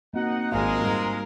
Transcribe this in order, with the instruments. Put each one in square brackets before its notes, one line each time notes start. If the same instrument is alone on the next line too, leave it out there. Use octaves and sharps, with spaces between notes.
[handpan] A#3 C4 F#4 [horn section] D#4 F#5
[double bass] G#1 [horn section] G#3 [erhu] A#4 [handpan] F5
[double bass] G#2 [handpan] G3 D#4 G4